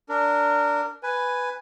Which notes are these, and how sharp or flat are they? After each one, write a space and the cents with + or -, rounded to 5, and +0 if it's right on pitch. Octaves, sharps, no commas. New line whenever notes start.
D4 -10 A#4 -20
B4 +5 G#5 +0